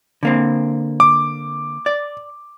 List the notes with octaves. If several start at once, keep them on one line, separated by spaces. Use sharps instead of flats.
D3 A#3 C4
D6
D5